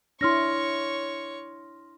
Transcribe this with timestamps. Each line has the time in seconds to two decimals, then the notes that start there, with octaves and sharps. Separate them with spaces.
0.21 D4 E4 C#5 C6 C#6 F6 A#6